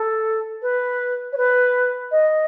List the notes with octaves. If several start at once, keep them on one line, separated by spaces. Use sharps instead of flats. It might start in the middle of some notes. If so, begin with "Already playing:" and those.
Already playing: A4
B4
C#5
B4
D#5